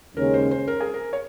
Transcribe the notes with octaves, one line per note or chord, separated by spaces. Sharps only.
D#2 C#3 G#3 C#4 A#4
C5
C5
A#4
G#4
A#4
C#5